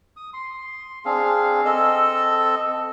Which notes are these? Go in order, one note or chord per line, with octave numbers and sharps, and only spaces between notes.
D#6
C6
C4 D4 G#4 F5
C4 A4 D#5 E6